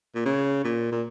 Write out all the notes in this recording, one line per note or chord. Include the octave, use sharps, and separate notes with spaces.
A#2
C#3
A#2
A#2